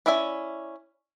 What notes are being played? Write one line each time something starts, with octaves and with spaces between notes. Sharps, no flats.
C#4 E4 D5 E5 G#5